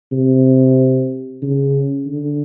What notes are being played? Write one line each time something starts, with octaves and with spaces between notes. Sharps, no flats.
C3
C#3
D3